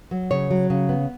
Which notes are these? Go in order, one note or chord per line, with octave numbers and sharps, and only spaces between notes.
F#3
C#3 C#5
F#3
C#3
B3